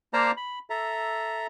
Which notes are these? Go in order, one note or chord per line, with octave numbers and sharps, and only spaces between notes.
A#3 C5 D5 F5 A5 A#5
B5
A4 E5 A#5